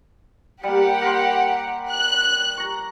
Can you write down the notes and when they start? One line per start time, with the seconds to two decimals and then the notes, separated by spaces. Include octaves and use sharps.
0.63 G3 A#3 G4 F#5
1.02 A#4 B5 C6
1.89 F#6
2.57 A#5 C#6